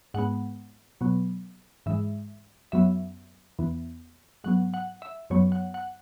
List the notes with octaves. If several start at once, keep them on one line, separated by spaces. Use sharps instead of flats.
G#2 G#3 B3 F#5
B2 F#3 B3
G#2 E3 G#3 E5
F#2 F#3 B3 E5
E2 E3 B3
G#2 F#3 B3 F#5
F#5
E5
F#2 F#3 B3 C#5
F#5
F#5